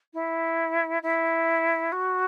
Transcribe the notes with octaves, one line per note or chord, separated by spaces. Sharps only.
E4
E4
F#4